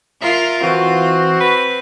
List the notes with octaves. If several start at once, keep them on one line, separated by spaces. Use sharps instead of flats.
F4 A#4 E5
E3 C4 F4 F#4
B4